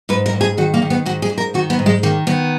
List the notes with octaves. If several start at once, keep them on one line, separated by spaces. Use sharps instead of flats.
G#2 B4
A#4
G#2
G#4
D#3 F#4
A#3
D#3
B3
G#2 F#4
G#4
G#2
A#4
D#3 F#4
B3
G#2
G#3
D#3 A#3
D#3 B3